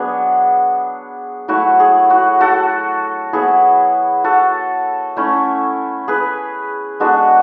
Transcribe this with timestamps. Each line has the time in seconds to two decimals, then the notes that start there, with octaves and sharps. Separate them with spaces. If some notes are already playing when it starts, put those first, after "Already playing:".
Already playing: F#3 B3 D4 G#4
1.48 F#3 A3 E4 F#4
1.80 G#4
2.10 F#4
2.41 F#4 A4
3.33 F#3 B3 E4 G#4
4.24 F#4 A4
5.16 A3 C#4 E4
6.08 G#4 B4
7.00 G#3 B3 D4 F#4 A4